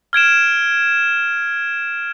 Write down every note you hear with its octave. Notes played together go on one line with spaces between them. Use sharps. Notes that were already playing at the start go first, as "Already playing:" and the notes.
F6 G#6 D7 E7